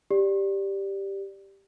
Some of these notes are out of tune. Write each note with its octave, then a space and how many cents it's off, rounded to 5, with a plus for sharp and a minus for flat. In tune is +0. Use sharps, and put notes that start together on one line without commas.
G4 +0 D5 +0